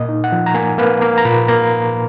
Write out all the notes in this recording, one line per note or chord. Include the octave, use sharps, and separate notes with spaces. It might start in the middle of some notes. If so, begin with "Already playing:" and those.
Already playing: A#2 A#3 D#5
D#4
F#5
F3
A#5
A#3 G#5
A#3 B4
A#3 A#5
A#5
A#2 B5
A#3 A#5